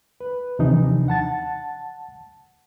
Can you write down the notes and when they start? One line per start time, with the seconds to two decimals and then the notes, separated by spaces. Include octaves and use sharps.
0.20 B4
0.59 D#2 C3 E3 F3 D4 D#4
1.08 F#5 A5 A6